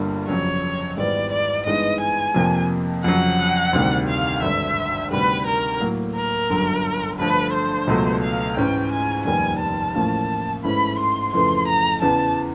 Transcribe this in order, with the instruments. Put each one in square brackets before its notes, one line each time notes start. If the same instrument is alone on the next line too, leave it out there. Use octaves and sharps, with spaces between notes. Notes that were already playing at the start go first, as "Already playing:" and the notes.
Already playing: [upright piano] G1 G2 D3 G3 A#3
[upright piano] F2 C#3 F#3 [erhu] C#5
[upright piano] G#1 G#2 E3 G3 B3 [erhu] D5
[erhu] D5
[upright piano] G2 E3 G#3 B3 D#4 [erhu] D#5
[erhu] G#5
[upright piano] F2 C3 F3 A#3
[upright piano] F2 C#3 F#3 [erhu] F#5
[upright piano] D2 C3 D#3 G3
[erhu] F5
[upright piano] G#1 G2 D3 [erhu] E5
[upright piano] D2 C3 D#3 G3 [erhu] B4
[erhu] A#4
[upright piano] A2 F#3 A#3
[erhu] A#4
[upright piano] G1 F#2 D3 F#3
[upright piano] G2 D3 F3 A3 [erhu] B4
[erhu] C5
[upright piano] C#2 B2 F#3 A3
[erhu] F5
[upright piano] G#2 E3 G#3 C#4 [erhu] G5
[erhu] G#5
[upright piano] F1 D#2 D#3 G3 B3 [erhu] G#5
[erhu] A5
[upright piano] A1 A2 F3 A#3 C#4
[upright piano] G#2 E3 A3 C#4 E4 [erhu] B5
[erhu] C6
[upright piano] F2 C#3 E3 A3 [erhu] C6
[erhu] A#5
[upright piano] E2 C#3 E3 [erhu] A5